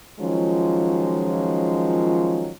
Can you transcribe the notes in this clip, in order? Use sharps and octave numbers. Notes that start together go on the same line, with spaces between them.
D#3 F3 F#3 G#3 C#4 F4